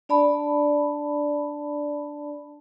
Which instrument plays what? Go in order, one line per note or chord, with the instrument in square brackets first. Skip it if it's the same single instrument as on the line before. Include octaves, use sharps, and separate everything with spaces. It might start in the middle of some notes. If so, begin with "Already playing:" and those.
[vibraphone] D4 D5 A5 B5